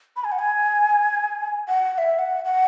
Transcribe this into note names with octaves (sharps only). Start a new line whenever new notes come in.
B5
G#5
F#5
G#5
F#5
F#5
E5
F#5
F#5